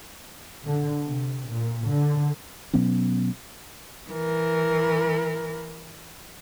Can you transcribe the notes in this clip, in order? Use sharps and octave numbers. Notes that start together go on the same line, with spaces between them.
D3
C3
A#2
D3
B2 F#3 B3 C#4
E3 A#4